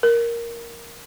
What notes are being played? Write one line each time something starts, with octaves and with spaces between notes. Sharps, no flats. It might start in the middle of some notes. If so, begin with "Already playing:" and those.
A#4